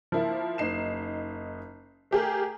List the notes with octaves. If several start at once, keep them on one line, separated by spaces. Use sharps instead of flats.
F3 A#3 E4
F#1 D#4 C7 E7
A3 G4 G#4 A#4